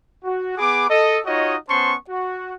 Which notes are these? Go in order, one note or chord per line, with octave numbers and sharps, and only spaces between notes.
F#4
B3 G#4 B5 D6
A4 D#5
D#4 F4 F#4 C#5 D#5
B3 C#4 C5 A5 C6 C#6
F#4